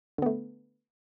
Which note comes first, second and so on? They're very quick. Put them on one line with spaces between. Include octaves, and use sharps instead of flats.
D3 B3 A3